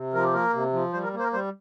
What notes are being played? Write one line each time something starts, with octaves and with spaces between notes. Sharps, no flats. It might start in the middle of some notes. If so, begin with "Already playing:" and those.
Already playing: C3
F3 A#4
G4
A#3 A#4
C3
F3
G3 C5
A#4
A#3
C5
A#4
G3 C5